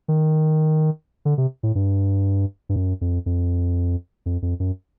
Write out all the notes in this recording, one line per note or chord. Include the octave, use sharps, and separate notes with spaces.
D#3
D3
C3
A2
G2
G2
F#2
F2
F2
F2
F2
F#2